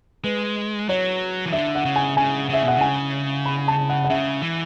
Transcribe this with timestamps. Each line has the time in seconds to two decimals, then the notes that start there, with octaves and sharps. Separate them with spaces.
0.24 G#3 B4
0.89 F#3 C#5
1.46 E3
1.52 D3 E5
1.75 F#5
1.85 C#3
1.96 G#5
2.17 C#3 G#5
2.50 C#3 E5
2.63 B2
2.68 F#5
2.76 C#3
2.81 G#5
3.46 B5
3.68 A5
3.90 F#5
4.04 F#5
4.10 C#3 E5
4.43 E3